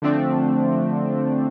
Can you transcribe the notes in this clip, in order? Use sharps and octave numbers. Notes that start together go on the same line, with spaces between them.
D3 F3 A3 C4 D4